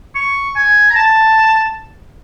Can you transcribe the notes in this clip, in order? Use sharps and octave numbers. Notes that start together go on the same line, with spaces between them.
C#6
G#5
A#5
A5